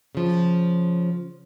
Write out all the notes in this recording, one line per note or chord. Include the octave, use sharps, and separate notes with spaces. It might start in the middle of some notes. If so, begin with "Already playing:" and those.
C#3 F3